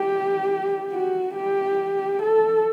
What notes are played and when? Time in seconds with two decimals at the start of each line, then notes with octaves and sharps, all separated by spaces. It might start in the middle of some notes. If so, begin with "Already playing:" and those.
Already playing: G4
0.92 F#4
1.35 G4
2.22 A4